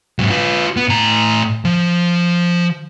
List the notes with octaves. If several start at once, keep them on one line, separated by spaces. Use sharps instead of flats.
G#2 F#3
F4 B4
B3
A2 A#5
F3